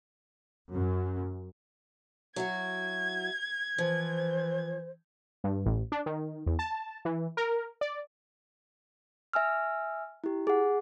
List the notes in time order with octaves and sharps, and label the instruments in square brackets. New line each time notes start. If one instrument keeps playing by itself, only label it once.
[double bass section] F#2
[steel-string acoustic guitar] F#3 E4 F#4 [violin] G#6
[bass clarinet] E3 [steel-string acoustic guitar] F3 [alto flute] C5
[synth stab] G2
A1
D4
D#3
E2
A5
E3
A#4
D5
[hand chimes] E5 G#5 E6 F6
E4 G4
G#4 F#5